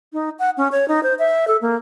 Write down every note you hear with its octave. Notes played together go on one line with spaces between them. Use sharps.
D#4
F#5
C#4
C#5
D#4
C5
E5
A4
A#3